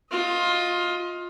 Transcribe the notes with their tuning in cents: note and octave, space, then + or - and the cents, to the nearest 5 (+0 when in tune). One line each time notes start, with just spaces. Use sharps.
F4 +15 D#5 +25